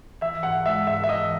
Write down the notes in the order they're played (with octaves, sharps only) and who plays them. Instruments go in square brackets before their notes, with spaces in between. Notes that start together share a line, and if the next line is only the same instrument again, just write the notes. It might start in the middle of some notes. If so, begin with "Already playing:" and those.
[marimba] E3 [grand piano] E5
[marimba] G#2 [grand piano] F#5
[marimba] G#3 [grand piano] E5
[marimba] G#2 [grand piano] E5
[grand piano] E5
[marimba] E3 [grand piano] D#5